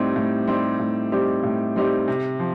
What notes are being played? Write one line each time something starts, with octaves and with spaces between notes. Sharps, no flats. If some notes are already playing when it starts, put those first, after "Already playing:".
Already playing: A2 G3 C4 D#4 G4
A2
G3 C4 D#4 G4
A2
G3 C4 D#4 G4
A2
G3 C4 D#4 G4
C3
F3